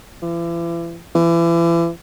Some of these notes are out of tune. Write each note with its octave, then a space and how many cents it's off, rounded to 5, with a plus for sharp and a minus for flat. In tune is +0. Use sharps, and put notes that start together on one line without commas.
E3 +40
E3 +35